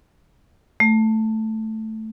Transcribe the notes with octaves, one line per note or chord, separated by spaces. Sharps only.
A3